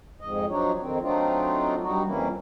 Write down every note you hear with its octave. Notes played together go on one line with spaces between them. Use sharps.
F2 G#2 D#5
F3 F#3 D4 D#4 C#5
F2 D#3 C4
F#3 A3 C4 D4 D#4 F4
G2 F#3 G3 D#4 F#4
F2 E3 G3 A#3 C#4 E4